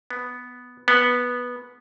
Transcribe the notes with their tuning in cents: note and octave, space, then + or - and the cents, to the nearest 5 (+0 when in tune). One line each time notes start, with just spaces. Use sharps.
B3 +0
B3 -10